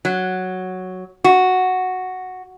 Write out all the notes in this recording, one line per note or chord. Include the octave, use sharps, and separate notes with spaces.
F#3
F#4